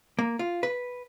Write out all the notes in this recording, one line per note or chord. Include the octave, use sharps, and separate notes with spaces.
A#3
F4
B4